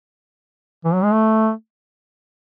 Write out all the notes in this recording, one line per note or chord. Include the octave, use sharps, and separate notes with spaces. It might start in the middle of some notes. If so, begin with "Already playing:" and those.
E3
F#3
G#3
A3